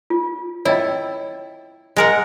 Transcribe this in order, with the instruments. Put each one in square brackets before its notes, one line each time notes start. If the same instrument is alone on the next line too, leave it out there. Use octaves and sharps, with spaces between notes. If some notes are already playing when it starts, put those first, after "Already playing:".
[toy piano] F4
[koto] E4 [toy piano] C#5 D#5 G5
[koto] G#3 A#4 F#5